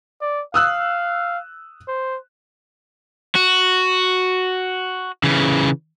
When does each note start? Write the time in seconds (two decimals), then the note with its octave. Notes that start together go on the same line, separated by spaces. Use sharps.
0.21 D5
0.54 F5 D#6 E6 F#6
1.88 C5
3.35 F#4
5.24 C#3 E3